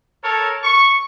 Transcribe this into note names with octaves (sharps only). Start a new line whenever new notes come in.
A4 A#4 C#5
C#6